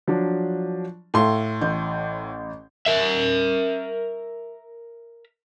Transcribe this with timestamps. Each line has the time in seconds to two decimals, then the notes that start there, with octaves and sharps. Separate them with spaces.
0.08 F3 F#3 D4
1.14 A2 A4 E5 F5 C6
1.61 A1 G6
2.87 A#4 E5